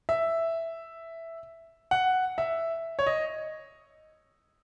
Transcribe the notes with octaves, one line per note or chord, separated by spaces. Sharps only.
E5
F#5
E5
C#5
D#5